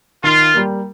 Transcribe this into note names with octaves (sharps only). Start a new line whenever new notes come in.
D#3 F4
G3 A#3